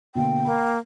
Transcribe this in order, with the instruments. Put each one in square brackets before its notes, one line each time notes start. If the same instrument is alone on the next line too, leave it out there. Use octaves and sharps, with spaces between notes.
[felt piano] B2 D3 A#3 [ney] G5
[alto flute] A#3 [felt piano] B5